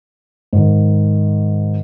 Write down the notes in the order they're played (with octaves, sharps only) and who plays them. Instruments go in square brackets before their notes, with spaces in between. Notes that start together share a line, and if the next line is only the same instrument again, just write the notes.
[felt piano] G#2 D#3